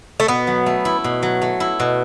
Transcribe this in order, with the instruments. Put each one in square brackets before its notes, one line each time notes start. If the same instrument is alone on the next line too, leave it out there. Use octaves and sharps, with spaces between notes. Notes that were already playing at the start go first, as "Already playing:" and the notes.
[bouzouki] A3
[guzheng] B2 [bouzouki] B3
[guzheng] F#3
A3
E4
B2
F#3
A3
E4
B2